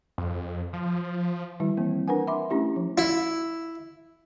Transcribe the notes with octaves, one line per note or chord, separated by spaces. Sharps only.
F2
F3
D#3 G3 E4
E3 A#3 C4
D4 A#4 B4 F#5 G#5
E5 B5 C6 D6
A3 C#4 D4 E4 G4
F3
E4